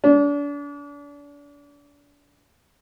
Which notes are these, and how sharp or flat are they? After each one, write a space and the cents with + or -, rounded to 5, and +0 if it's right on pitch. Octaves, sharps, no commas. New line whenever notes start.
D4 -35